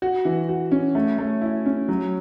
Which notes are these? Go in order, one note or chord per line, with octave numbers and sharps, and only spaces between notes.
F#4
E3
F#4
C#4
A3
A3
E4
C#4
F#3